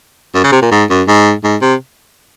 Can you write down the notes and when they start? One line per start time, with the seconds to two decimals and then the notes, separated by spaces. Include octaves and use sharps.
0.35 F#2
0.44 C#3
0.52 C3
0.62 A#2
0.71 G#2
0.90 F#2
1.07 G#2
1.44 G#2
1.62 C3